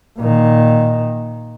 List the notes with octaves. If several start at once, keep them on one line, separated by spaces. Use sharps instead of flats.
A#2 D#3